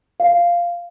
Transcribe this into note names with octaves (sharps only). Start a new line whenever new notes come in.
F5